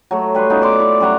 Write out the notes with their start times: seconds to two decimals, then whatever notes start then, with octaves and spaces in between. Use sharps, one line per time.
0.11 F#3 A3
0.34 G3 B4 C6 C#6
0.50 B3 C#4 D#4 F4
0.62 D5 C6 D6
0.80 E4
1.00 F#2 G3 F#4 A#5